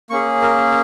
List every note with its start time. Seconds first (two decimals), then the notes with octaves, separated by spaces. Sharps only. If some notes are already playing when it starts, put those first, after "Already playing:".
0.10 A#3 C#4 G#4 C#6
0.42 A#4